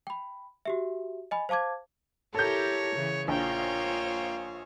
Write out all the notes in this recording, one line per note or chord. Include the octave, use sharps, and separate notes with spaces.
G5 B5
F#4 G4 E5
D#5 G#5 B5
C5 F5 A5 D6 G#6
E4 G4 A4 A#4 C#5 G6
C#3 E3
A#1 A#3 F4 C5 C#5 G5